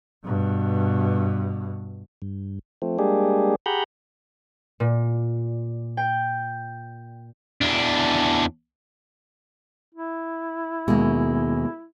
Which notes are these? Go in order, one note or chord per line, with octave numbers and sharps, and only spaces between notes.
G2 B2
G2
F3 A3 C4
G3 G#3 A#3 D4 G4 G#4
G4 G#4 F#5 A#5 B5 G6
A#2
G5
E2 D4
E4
D#2 B2 G#3 A#3